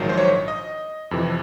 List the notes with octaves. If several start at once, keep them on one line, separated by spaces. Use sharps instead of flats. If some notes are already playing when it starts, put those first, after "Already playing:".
Already playing: A#1 G#2 D#3 F#3
C5
C#5
D#5
F2 C3 E3